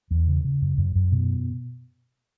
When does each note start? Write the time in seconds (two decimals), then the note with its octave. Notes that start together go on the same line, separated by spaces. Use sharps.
0.11 E2
0.28 C#3
0.45 C#3
0.62 F#2
0.78 F#2
0.95 F#2
1.12 B2